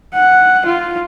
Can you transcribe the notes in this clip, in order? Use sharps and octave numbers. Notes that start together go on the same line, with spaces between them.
F#5
F4